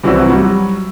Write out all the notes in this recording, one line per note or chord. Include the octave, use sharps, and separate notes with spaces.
C2 E3 F#3 C4 F#4 E6
F#3 G3 F#4